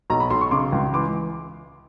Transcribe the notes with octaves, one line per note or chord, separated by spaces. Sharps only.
B1 A#5
B5
B1 C6
C#6
C#3 C6 D6
C#2
E3 C6 D6